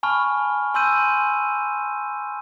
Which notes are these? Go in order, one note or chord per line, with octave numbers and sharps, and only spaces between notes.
G#5 A5 B5 C#6 F6
G#5 C6 E6 G6 D#7